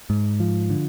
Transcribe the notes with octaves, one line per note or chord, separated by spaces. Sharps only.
G#2
F3
D3